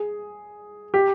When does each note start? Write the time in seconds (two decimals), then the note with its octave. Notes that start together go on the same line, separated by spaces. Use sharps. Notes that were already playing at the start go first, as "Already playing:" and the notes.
Already playing: G#4
0.94 G4